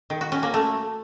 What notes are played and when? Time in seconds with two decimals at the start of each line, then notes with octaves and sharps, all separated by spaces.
0.10 D#3
0.21 F#4
0.32 C#4
0.43 A#3
0.54 A3